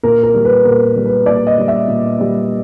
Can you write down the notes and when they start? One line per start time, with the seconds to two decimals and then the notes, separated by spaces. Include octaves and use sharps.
0.03 A#2 A#4
0.23 A#4
0.34 G3
0.45 B4
0.65 A#2 A#4
0.96 G3
1.06 B4
1.26 A#2 D5
1.47 D#5
1.58 G3
1.68 E5
1.88 A#2
2.19 G3